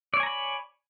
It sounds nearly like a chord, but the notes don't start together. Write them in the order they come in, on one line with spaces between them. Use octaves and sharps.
D5 C#5 G#5 A#5 B5